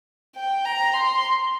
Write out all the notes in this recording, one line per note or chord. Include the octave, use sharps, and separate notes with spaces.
G5
A#5
C6